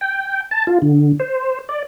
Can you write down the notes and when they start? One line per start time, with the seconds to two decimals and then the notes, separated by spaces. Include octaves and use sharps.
0.01 G5
0.51 A5
0.67 F4
0.82 D3
1.20 C5
1.69 D5